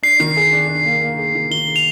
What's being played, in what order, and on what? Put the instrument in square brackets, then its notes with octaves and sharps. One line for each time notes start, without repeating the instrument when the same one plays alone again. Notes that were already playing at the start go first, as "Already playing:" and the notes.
[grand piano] D4 [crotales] C7
[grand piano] D#3
G#4
D4
D4
A#3
A#3
G#4
D#3
[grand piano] D#3 [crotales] G7
[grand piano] G#4
[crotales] F7